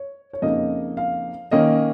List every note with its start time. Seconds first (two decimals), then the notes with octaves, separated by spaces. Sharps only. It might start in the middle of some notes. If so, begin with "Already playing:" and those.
Already playing: C#5
0.33 C#5
0.42 F2 C#3 A#3 D#4 D#5
0.97 F5
1.51 D#3 A#3 C#4 D#5